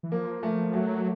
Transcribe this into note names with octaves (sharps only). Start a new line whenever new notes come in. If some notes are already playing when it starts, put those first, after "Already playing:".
E3
F3 A#3
F3 A3
F#3 A3